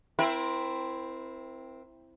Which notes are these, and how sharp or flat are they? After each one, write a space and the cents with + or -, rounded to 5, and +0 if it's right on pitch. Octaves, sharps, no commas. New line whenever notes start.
C4 +0 E4 +10 A#4 +40